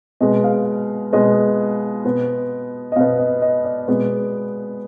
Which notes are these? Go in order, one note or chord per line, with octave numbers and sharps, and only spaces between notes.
B2 G#3 B3 D#5
F5
B2 G#3 B3 D#5
B2 B3
D#5
B2 B3 F5
D#5
D#5
D5
B2 G#3 B3